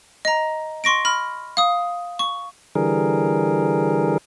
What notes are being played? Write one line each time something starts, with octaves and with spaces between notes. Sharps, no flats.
D#5 A#5
C6 C#6 A#6 D7
B5 F6
F5 D#6
C#6
D3 E3 G3 G#4 A#4